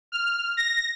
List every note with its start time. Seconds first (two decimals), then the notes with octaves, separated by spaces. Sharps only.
0.12 F6
0.57 A#6